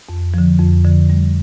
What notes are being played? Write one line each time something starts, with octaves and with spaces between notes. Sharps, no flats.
F2
D3 F3
F2
D3 F3
G3